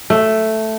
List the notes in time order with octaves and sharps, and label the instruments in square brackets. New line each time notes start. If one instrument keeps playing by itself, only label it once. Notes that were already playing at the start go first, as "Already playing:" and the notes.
[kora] A3